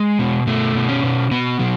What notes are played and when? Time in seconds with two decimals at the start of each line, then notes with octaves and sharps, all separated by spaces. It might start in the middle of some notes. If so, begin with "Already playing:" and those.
Already playing: G#3
0.19 B2
0.47 B2 A3
0.75 B2
0.89 C#4
1.03 B2
1.31 B2 B3
1.59 B2 F#3